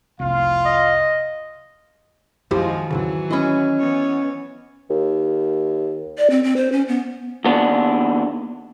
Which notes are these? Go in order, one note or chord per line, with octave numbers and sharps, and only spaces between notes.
F1 C2 F4 F5
D#5
F#2 D#3 F3 G#3 E4 F#4 G4 C5
E2 G#2 C#3 E3 F#3
C#4 E4 D#5 B5
E3 B3 C#5
D#2
D5
C4
C4
C5
C#4
B3
D#2 B3 D4